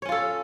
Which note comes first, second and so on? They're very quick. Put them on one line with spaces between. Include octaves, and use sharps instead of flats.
C#5 C#4 F4 A4